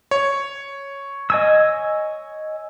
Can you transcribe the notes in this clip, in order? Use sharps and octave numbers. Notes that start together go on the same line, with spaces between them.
C#5
D#5 G#5 E6